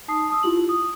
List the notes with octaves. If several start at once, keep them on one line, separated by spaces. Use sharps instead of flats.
D#4 A5 D#6 C7
A5 D#6 E6
E4 F4 G4 F#7
D#6